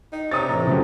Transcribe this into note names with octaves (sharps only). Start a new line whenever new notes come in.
D#4
C3 D4 C#5 A#5 C#6 D#6 A6
A2 E3 A#5
F2 C#3 F#3 A3 C4